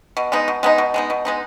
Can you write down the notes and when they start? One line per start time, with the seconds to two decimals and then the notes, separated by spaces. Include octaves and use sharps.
0.17 B2
0.32 G#3 B3 D#4
0.48 B2
0.63 G#3 B3 D#4
0.78 B2
0.94 G#3 B3 D#4
1.10 B2
1.25 G#3 B3 D#4